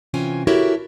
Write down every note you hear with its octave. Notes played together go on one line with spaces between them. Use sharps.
C3 E3 C#4 F4 G5 G#5
E4 F#4 G4 A4 A#4 C#5